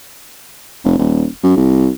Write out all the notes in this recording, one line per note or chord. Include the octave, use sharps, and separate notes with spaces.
F1
D#1
F#2
C2